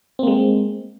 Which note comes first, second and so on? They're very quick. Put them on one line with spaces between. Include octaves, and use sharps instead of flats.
C4 A#3 G#3